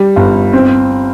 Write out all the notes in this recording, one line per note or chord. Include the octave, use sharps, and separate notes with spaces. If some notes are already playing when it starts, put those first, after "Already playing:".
Already playing: G3
G1
C4